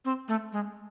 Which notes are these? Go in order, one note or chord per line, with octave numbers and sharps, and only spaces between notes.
C4
A3
G#3